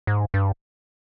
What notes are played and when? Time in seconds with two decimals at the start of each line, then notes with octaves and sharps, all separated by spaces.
0.07 G#2
0.34 G2